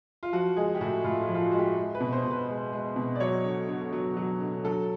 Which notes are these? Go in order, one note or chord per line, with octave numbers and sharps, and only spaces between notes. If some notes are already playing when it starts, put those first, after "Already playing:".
F4
F3 F#4
G#3 G#4
G4
A2 F#4
A2 F4
F4
F3
F4
F#4
G#3 F#4
G4
G#3
B4
B2
C5
B2
B4
G#3
G#3
B2
D5
F#3 C#5
D3
D3
F#3
F#3
D3
F#3 A4